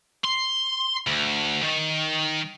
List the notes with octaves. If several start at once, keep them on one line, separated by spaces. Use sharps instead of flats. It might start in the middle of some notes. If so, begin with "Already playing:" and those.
C6
D2
D#3